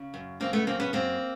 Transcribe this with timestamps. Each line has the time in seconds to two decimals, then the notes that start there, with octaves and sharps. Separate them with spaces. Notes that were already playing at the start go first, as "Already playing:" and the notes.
Already playing: C#3
0.14 F#2
0.40 C#3 A#3 C4
0.53 A3 B3
0.67 F#2 A#3 C4
0.80 B3 C#4
0.93 F#2 A#3 C4